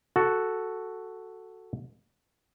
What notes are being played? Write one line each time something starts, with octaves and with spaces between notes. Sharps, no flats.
F#4 A4